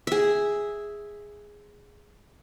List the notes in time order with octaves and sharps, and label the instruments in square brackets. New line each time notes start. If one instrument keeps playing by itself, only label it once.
[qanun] G#4 E5